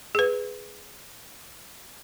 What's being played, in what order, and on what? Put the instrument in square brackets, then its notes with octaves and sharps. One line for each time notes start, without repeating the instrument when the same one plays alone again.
[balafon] G#4 B4